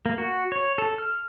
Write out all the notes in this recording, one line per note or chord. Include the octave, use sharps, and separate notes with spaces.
A#3
F#4
C#5
A4
F6